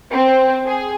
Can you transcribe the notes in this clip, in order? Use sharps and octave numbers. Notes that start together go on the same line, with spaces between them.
C4
G#4